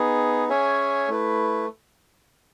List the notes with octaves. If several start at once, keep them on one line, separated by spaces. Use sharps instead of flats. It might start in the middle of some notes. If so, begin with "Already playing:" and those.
Already playing: B3 D#4 G#4
C#4 G#4 C#5 E5 G#5
A3 E4 B4